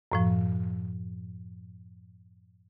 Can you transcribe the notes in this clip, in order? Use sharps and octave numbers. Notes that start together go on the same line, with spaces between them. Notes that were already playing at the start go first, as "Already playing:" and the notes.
F#2 A2 F3